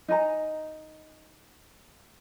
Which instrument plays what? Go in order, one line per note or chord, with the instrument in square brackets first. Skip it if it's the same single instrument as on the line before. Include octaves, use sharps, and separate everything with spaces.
[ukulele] D#4 D#5 G#5 A#5